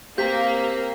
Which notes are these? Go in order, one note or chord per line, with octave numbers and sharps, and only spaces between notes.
A#3 C4 G4 G6 B6